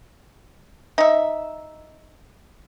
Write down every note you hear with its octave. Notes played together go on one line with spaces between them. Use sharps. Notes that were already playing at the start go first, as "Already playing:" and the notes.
D#4 E5